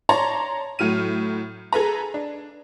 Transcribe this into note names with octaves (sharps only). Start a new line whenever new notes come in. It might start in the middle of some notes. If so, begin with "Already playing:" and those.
C#5 D5 A5 A#5 C6
A2 F#3 F6 D#7
G#4 A4 B4 A#5
D4